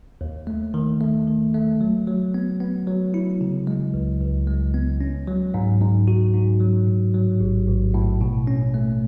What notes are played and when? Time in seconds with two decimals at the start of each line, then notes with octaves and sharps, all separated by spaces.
0.21 D#2
0.47 A3
0.74 D#3
1.01 A3
1.28 D#3
1.54 A3
1.81 F#3
2.07 F#3
2.34 B3
2.60 B3
2.87 F#3
3.14 E4
3.41 C#3
3.67 G#3
3.94 C#2
4.21 C#2
4.47 G#3
4.74 B3
5.01 C#4
5.27 F#3
5.54 G#2
5.81 G#2
6.08 F#4
6.34 G#2
6.61 F#3
6.87 A2
7.14 F#3
7.40 A1
7.67 A1
7.94 A2
8.21 B2
8.47 C#4
8.74 A3